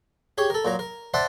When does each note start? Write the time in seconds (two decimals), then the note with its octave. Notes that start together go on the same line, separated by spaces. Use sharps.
0.38 G4 G#4 C#5
0.50 A4 A#4
0.65 A#2 F#3 A#5
0.79 A#4
1.14 C5 D5 E5 F#5 A5